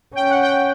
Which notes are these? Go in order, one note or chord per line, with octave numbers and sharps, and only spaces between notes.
C#4 G5
F#5
G5